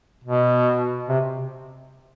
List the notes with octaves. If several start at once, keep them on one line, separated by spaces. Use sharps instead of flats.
B2
C3